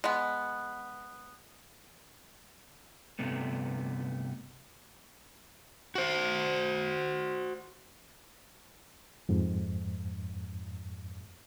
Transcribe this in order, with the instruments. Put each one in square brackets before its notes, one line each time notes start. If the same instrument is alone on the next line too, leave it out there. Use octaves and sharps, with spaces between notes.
[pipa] G#3 B3
[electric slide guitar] G2 C3 A3 B3
F#4 C5
[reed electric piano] F2 G#2